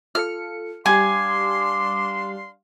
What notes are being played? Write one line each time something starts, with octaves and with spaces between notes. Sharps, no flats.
F4 A4 F6 C#7
G3 D4 G4 F5 G#5 C6 D6